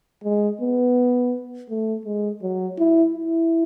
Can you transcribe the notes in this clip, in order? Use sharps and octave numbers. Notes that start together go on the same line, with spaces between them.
G#3
B3
A3
G#3
F#3
E4
E4